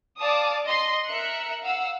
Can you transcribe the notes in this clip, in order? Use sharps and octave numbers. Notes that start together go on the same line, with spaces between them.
D5 F5 A5 D6 D#6
D#5 C6
A#4 E5 F#6 C#7
F5 F#5 E6